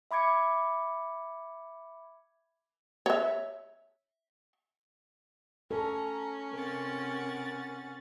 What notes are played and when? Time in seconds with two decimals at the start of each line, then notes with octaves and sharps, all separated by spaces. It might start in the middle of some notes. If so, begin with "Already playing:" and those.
0.11 E5 B5 D6 G#6 C#7
3.06 C#5 E5
5.71 C#4 A4 A#5
6.53 C3 A#4 F#5 A6